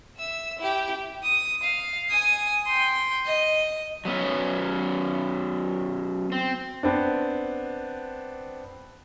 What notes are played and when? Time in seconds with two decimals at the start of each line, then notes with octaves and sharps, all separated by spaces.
0.16 E5 E6
0.58 E4 G4
1.23 D#6
1.63 F5
2.10 G#5 D#6
2.66 G5 C6
3.26 D#5
4.05 F#3 B3 C#4
6.32 C4
6.83 B3 C4 D4